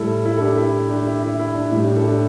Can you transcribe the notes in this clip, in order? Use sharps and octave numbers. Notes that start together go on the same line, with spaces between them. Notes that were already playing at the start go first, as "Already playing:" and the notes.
Already playing: A2 G3 E4 A4
E4
A4
D4 G4
E4 A4
D4 G4
E4
E4
E4
D4
A2 G3 E4
D4 G4
E4 A4
D4 G4